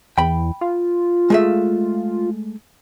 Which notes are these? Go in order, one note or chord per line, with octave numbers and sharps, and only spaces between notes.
E2 G5 B5
F4
G#3 A3 E5